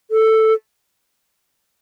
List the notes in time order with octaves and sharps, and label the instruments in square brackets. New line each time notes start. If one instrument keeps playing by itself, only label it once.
[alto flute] A4